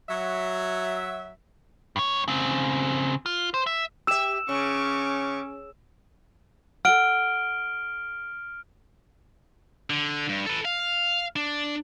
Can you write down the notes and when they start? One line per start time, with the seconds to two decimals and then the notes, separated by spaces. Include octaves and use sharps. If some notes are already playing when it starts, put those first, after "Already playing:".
0.09 F#3 E5
1.96 G2 C#5
2.28 C#3 C4
3.26 F4
3.54 C5
3.67 E5
4.07 G4 E5 E6 E7
4.49 C#3 C#4 C#6 D6
6.85 A4 F#5 F6 D7 G7
9.90 D3
10.29 G2
10.46 A4 B4
10.65 F5
11.36 D4